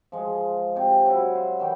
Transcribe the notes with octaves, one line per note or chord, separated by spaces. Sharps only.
F3 G#3
C3 G5
F#3 E4
C5
D#3 E3 G5